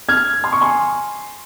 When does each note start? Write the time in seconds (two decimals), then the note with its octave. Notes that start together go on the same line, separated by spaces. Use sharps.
0.09 F6 G#6
0.44 C6
0.53 C#6
0.61 G#5 C6